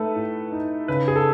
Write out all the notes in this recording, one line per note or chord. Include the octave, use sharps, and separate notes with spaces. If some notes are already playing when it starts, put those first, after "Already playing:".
Already playing: A3 D#4 A4 B4
A2
D#4
C#3 B4
G#4
A4